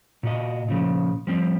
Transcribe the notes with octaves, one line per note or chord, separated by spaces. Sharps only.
A#2 F#4 D#5
A#2 C#3 F3
F3 G3 C4